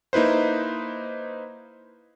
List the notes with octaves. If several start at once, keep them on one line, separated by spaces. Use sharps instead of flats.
A#3 D#4 E4 B4 C5